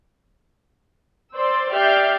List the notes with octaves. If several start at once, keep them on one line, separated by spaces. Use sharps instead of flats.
C5 D5 C6 E6
G4 D5 E5 F6 G6 C7